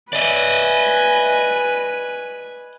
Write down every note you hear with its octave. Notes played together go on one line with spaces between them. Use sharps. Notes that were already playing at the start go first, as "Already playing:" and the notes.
B4 D5 D#5 G#5